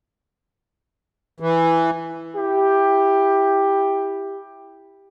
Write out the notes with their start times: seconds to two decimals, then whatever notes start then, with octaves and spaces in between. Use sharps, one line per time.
1.40 E3
2.36 E4 G4